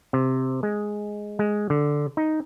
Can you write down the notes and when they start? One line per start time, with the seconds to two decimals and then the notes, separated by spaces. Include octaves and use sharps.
0.13 C3
0.63 G#3
1.39 G#3
1.70 D3
2.17 D#4